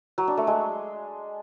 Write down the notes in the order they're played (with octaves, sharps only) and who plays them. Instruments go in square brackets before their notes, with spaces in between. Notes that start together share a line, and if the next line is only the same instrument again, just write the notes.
[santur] F#3
D4
A3
G#3